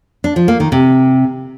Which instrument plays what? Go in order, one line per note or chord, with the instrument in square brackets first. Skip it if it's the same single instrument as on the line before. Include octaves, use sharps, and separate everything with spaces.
[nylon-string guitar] D4
F3
A#3
D#3
C3